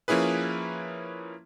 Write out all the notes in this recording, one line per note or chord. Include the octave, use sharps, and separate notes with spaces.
F3 A#3 C#4 E4 G#4 B4